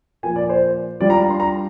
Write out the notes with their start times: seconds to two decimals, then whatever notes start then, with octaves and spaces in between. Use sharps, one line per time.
0.23 A#2 F3 A#3 G#5
0.36 D5
0.49 C5
1.01 G3 D4 F4 D5
1.10 A#5
1.20 A#5
1.30 C6
1.40 A#5